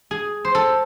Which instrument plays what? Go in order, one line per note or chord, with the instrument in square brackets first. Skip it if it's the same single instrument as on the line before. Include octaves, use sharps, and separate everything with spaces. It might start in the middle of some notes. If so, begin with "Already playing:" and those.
[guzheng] G#4
C5
A4